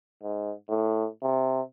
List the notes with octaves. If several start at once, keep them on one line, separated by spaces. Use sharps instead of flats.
G#2
A2
C3